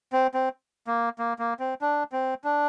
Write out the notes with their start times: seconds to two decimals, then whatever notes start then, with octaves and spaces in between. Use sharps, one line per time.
0.12 C4
0.34 C4
0.87 A#3
1.19 A#3
1.39 A#3
1.60 C4
1.81 D4
2.12 C4
2.44 D4